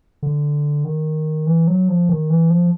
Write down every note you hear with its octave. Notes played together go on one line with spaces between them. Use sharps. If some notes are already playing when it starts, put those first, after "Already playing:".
D3
D#3
E3
F#3
F3
D#3
E3
F3